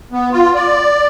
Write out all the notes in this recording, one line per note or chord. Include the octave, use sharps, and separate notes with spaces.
B3
F4
D5